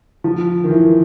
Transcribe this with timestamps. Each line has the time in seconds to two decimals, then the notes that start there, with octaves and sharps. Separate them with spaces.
0.24 F3
0.64 D#3
0.69 E3
0.83 D#3